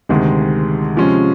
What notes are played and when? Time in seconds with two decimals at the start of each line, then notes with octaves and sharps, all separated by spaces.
0.09 D2 C3 D#3 G#3
0.96 C3 F3 G#3 C#4